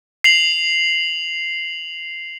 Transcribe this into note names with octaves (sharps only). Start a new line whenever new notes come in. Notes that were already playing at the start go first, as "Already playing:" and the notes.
C7 F7 F#7